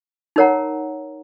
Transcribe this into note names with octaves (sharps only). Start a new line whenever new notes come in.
D#4 A#4 C#5 F#5 A#5